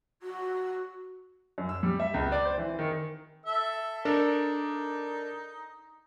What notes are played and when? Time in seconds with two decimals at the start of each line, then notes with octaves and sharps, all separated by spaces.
0.22 F#4
1.58 F#2
1.69 E6
1.83 G3
2.00 E5
2.14 C#2
2.32 D5
2.45 C5
2.58 E3
2.79 D#3
3.46 A4 E5 E6
4.05 D4 D#4 A4 A#4